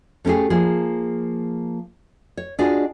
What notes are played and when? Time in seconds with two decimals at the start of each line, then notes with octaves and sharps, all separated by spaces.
0.25 A3 C#4 D4 G4 G#4
0.50 F3 A#3 G#4
2.37 C#5
2.59 D4 F4 F#4 G#4 D5 D#5